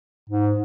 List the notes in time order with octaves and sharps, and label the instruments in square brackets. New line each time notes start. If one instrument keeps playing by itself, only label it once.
[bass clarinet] G#2